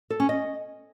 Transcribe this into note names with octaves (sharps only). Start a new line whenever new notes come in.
A4
C#4
D#5